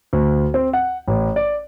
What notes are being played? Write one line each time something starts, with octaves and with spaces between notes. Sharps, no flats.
D2
C4
F#5
A1
D5